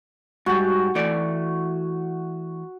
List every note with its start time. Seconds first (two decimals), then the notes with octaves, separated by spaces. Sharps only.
0.46 G#2 G3 F#4
0.95 E3 A3 D5